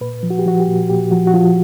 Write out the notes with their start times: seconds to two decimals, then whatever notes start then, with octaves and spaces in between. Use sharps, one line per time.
0.01 A#2 B4
0.23 F3
0.30 F#4
0.39 G4
0.46 F3 F#4
0.60 G4
0.68 A#2
0.90 A#2 G4
1.11 F3 F#4
1.27 F#4
1.34 F3 F4